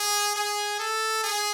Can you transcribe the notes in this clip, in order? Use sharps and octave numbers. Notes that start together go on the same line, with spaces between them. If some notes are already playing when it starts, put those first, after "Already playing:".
Already playing: G#4
G#4
A4
G#4